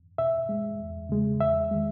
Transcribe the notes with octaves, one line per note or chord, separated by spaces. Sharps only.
B2 E5
G#3
E2
C#3 G#3
E2 E5
D#3 G#3